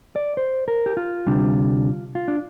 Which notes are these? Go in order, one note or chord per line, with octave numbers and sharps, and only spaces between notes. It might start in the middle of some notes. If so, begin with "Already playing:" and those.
D5
C5
A#4
G4
F4
D2 C3 G3 D4
F4
D4